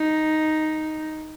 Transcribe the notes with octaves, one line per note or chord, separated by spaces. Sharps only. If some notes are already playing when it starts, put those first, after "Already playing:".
Already playing: D#4